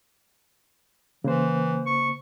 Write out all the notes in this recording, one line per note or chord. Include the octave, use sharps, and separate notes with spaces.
C#3 E3 A#3 C5
C#6